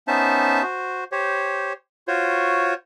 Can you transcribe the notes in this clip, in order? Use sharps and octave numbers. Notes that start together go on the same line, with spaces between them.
B3 C#4 D#4 C5 E5 A5
F#4 C5
G4 C5 C#5
F4 F#4 C5 C#5